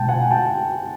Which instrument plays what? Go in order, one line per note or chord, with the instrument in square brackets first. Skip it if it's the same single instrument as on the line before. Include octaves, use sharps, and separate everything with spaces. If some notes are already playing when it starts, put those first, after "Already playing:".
Already playing: [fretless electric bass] B2 G#3 [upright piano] G5 A5
[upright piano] F#5 G#5
G5 A5